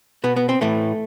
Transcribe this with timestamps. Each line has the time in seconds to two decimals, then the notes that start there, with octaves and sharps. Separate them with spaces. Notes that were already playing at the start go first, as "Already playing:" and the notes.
0.24 B2 B3
0.36 B3
0.49 C4
0.61 A2 E3 A3